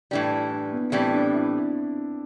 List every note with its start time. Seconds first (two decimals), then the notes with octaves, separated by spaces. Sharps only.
0.11 A2 E3 G3 D4
0.32 E4
0.51 D4
0.72 B3
0.92 A2 E3 G3 C4
1.12 D4
1.33 E4